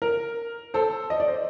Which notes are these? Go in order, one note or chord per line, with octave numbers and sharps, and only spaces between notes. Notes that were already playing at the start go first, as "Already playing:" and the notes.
A#4
A4 C5
D#5
D5
C5